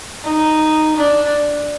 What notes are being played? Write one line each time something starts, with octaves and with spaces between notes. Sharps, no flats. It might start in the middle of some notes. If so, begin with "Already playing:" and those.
D#4
D4